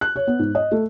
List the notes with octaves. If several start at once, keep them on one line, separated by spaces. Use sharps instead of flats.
F#6
C#5
B3
G#2
D#5
A3